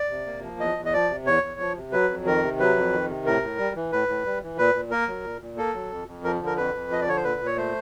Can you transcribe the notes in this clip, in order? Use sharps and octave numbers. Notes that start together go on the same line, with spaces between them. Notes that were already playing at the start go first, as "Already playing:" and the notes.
Already playing: D5
C3
A#3
F3
E2 D#5
E2
D#5
F3 D5
C3
E2 C#5
E2
F3
C3
F#3 B4
F2
D#3 A#4
C3
F#3 B4
F2
D#3
C3
A2 A#4
A2
G3
E3
A2 B4
A2
G3
E3
A#2 B4
A#2
A#3 A#4
F#3
A#2
A#2
A#3 A4
F#3
F2
F2
F3 A#4
D3
A#4
F2 B4
F2
F3 D#5
D5
D3 C#5
C5
A#2 B4
A#2
C#5
A3 C5